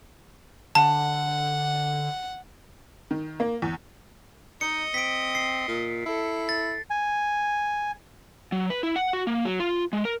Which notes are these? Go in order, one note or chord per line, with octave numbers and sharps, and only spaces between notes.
D3 F#5 A5
D#3
A#3
E2
D#4 D#5 C#7
C4 B6 D7
C7
A#2
E4 A4
A6
G#5
F#3
B4
E4
F#5
F#4
A#3
F#3
F4
G#3
A#4